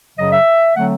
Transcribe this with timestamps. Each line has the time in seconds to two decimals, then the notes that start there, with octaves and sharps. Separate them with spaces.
0.16 F#2 C#3 F#3 D#5
0.32 E5
0.75 D3 F#3 A3 C4 F#5